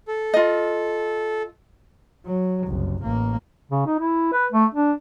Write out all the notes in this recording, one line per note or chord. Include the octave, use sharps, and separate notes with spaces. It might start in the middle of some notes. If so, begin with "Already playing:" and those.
A4
F4 D#5
F#3
F#1 C2
A1 A#3
C#3
D#4
E4
B4
A3
D4